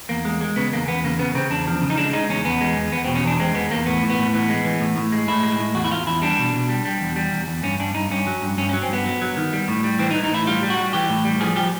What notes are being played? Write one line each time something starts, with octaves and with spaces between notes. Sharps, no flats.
E2 A#3
G#3
G#3
C#3 B3
E2 A#3
E2 B3
C#3 A#3
C#3 B3
C#3 C4
E2 D4
F3
C#3
D#4
G#3 D4
G#3 D#4
E2 C#4
E2 B3
G#3
E2
E2 B3
B2 C4
C#4
E2 D4
G#3 C4
E2 B3
E2 A#3
A2 B3
A2
B3
A2
E3 B3
G#3
E3
A2
A2
G#3
A2 E4
G#3
A2
E2 F#4
E4
E2 F4
E2 E4
G3 D4
B2
B2
G3
G3
E2
G3
E2
E2
G2 C#4
G2 D4
G2 D#4
G2 C#4
F#3
G2
G2 C#4
C#4
F#3
C4
G2 B3
F#3
F#3
D#3
G3
A2
G3
E3 C4
D#4
E3
D#4
A2 E4
G3 F4
G3
F#4
G3
E3 G4
A2
G3
F3 G#4
F3 G4